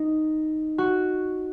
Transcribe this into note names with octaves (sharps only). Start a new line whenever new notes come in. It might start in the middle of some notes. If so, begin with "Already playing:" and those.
Already playing: D#4
F#4